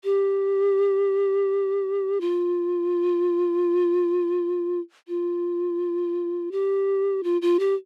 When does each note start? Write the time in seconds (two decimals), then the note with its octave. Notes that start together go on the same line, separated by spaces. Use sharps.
0.04 G4
2.21 F4
5.08 F4
6.52 G4
7.24 F4
7.42 F4
7.59 G4